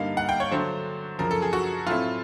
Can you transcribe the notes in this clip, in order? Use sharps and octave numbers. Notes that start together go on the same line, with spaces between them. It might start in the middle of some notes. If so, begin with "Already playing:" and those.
Already playing: G2 D3 G3 A#3 D#4 F5
F#5
G5
C#5
D3 F#3 A3 D4 C5
F#2 C#3 F3 A#4
A4
G#4
F#4
A2 F#3 A3 C4 E4 F4